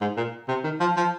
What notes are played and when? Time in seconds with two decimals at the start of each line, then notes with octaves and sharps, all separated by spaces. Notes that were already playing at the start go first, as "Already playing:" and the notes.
0.01 G#2
0.17 A#2
0.48 C3
0.64 D#3
0.80 F3
0.97 F3